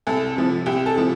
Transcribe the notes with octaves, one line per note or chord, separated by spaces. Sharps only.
C2 A4
C3 F3
C2 G4
A4
C3 F3